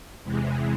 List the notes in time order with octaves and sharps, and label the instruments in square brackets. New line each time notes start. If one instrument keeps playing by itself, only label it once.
[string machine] E2 C3 E3 G#3